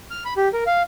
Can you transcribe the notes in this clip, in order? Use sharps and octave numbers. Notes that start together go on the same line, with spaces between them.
F6
B5
G4
A#4
F5